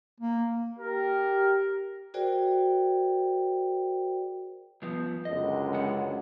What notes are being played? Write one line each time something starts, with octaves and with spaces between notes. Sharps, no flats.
A#3
G4 A#4
F#4 G#4 A#4 C5 D5 G5
G2 F3 B3
C#2 F#2 D3 D#5
G#3 C#4 F#5